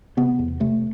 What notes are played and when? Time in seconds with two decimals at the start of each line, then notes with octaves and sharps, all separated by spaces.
0.17 C3 B3
0.39 E2
0.60 C3 A3